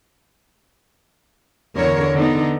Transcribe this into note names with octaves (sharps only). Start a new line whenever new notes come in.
E2 D3 A#4 C#5
D3 B3 D#4